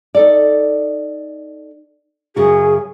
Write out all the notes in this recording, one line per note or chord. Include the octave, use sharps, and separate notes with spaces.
D#4 A4 D5
F#2 C#3 F#4 G#4